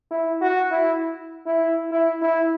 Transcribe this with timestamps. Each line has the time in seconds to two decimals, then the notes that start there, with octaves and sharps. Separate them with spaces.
0.11 E4
0.41 F#4
0.71 E4
1.46 E4
1.91 E4
2.21 E4